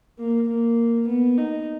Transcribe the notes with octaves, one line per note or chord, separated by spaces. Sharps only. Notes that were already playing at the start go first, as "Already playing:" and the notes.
A#3
A#3
B3
D#4